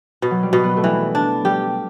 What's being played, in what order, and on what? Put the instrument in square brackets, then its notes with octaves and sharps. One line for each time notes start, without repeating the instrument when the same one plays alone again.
[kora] B2
[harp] F#3
G3
[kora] B2
[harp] B3
A3
[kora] E3 [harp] G3
[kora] D4
[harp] G3 [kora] G4